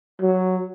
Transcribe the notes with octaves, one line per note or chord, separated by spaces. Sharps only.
F#3